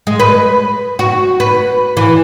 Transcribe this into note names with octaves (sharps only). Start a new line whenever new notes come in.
G#3
B4
F#4
B4
E3